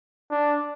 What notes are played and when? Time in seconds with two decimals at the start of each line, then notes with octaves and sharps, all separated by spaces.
0.31 D4